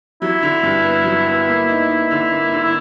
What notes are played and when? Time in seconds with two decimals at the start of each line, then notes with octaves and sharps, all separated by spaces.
0.22 F#3 E4
0.42 D3
0.63 G2
0.84 B3
1.05 F#3
1.26 B3
1.48 A#3
1.69 D#4
1.89 D#4
2.11 D3
2.31 A#3
2.52 D3
2.63 E4